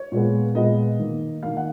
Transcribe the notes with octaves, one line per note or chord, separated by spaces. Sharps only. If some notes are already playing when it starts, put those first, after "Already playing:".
Already playing: C#5
A#2 G#3 B3
A#2 G#3 B3 D#5
D#3 A#3
D#3 A#3 F5
F#5